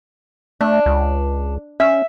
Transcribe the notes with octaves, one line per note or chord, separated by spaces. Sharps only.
A3 D4
C#2
C#4 E5